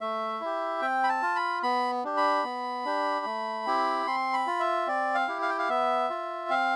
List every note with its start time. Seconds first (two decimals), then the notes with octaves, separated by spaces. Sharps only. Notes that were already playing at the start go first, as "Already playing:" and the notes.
0.01 A3 E5
0.40 E4 G4
0.81 C4 G5
1.04 B5
1.09 A5
1.22 F4
1.36 B5
1.63 B3 B5
2.04 D4 G4
2.17 B5
2.44 B3
2.85 D4 G4
3.25 A3
3.66 C4 E4 G4
4.07 C4 C6
4.33 B5
4.47 F4
4.60 E5
4.87 C4 D5
5.15 F5
5.28 E4 G4
5.42 F5
5.49 G5
5.59 F5
5.69 B3 E5
6.10 F4
6.50 C4 F5